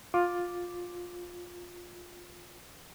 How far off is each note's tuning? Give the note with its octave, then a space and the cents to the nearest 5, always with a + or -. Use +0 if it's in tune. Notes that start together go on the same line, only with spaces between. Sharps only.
F4 +15 D6 +0